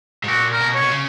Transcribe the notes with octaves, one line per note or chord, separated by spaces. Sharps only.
G#2
A#2 F#4
A#4
B2
C#5
B2
C#3